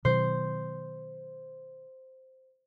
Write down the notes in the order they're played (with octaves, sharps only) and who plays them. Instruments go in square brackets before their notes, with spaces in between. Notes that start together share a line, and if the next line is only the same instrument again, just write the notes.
[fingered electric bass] B2 D#3 F#3 [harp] C5